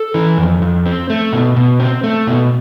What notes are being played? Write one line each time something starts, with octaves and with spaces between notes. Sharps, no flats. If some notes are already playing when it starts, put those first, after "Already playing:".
Already playing: A4
E3
F2
F2
C4
A3
B2
B2
C4
A3
B2